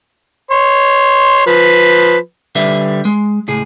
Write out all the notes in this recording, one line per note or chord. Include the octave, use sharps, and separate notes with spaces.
C#5 C6
F3 B4
D3 G3 B4 E5
G#3
C#2 A2 G#4